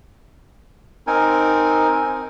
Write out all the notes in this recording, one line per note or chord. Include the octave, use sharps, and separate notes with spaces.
C4 D#4 A#4 G#5